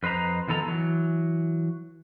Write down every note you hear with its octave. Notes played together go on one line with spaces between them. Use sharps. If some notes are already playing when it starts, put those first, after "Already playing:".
F2 B4 C5 D#5 A#5
F2 D#3 B3 A4 A#5
E3 F#3